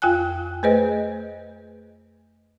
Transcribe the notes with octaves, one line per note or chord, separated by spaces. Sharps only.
F2 F4 G5 G#5 F#6
A3 G#4 B4 C5 D#5